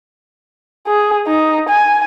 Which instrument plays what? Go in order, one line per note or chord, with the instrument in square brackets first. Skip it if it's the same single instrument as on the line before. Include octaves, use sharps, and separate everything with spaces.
[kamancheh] G#4
D#4
G#5